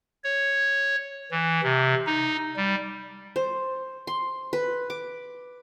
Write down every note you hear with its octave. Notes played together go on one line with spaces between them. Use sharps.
C#5
E3
C3
D#4
G3
C5
C6
B4
D6